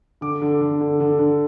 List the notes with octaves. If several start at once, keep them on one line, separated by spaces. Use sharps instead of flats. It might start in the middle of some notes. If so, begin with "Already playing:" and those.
D3 D6
D3
D3
D3
D3
D3